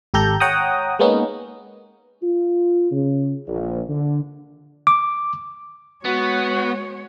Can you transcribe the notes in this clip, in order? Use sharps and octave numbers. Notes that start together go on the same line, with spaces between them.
G#1 G4 A4 A#5 G6
C#5 F#5 G5 A#5 D#6
G#3 A#3 B3 C#4 D#4
F4
C#3
A#1
D3
D6
G#3 B3 F#4 C#5